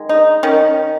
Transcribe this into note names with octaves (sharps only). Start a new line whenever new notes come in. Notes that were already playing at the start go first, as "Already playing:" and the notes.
Already playing: D#3 G#3
D#4
D#3 C#4